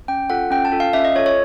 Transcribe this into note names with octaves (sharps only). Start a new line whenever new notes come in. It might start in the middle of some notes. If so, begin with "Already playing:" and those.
C#4 G5
F4 A4 F#5
C#4 G5
A5
F4 A4
F5
C#4 E5
D#5
F4 A4 C#5
C#5